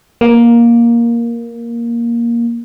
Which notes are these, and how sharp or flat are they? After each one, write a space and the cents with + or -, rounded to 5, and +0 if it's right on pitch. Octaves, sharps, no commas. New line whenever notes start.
A#3 +10